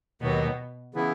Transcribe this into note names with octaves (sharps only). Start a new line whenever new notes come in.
D#2 B2 D#3 F#3 B3
C#3 E3 B3 E4